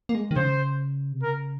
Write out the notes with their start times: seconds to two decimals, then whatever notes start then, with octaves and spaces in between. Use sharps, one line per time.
0.09 A#3
0.15 G#3
0.31 D#3
0.36 C#3 C5
1.12 C3
1.23 C#3 A#4